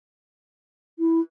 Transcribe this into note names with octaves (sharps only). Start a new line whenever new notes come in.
E4